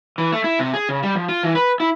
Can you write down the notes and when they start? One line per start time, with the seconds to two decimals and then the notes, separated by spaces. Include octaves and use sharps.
0.18 E3
0.32 A3
0.44 E4
0.59 C3
0.74 G#4
0.89 C#3
1.03 G3
1.15 F3
1.29 F4
1.43 E3
1.55 B4
1.80 E4